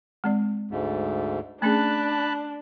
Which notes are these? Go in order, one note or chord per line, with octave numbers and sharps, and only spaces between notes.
G#3 C4 D5
D2 G#2
A3 C#4 D4 G#4 A5 B5 F#6